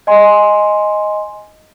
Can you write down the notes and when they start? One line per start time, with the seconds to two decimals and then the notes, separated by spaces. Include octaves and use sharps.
0.07 D#5 G#5 C6